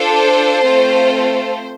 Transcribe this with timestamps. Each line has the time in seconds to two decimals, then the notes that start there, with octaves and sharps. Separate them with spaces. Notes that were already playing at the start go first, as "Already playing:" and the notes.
Already playing: D4 F4 A4 C5
0.63 A3 C4 F4 A4